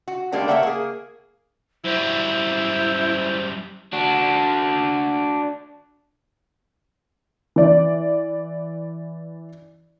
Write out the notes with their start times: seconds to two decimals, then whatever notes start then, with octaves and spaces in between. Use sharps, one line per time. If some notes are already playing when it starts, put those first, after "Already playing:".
0.08 F#4
0.32 G3 G#3 A#3 D4 G4
0.48 A3 A#3 C#5 E5 F#5 G5
0.63 A#3 G#4
1.84 F#2 G3 E4 C5
3.93 D4 F#4
7.56 E3 D5